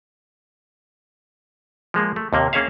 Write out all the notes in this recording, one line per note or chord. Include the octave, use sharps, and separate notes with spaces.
F3 G#3 A#3
A3
D#2 C3 A#3
A#3 C#4 G#4 C#5 E5 F5